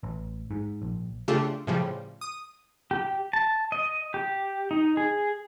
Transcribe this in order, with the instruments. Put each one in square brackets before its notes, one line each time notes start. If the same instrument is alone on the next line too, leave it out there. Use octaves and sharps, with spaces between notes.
[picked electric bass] A1
G#2
A#1
[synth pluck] C#3 A3 D4 F4 G4 A4
A2 C#3 F3 G3
D#6
[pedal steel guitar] G4
A5
D#5
G4
D#4
G#4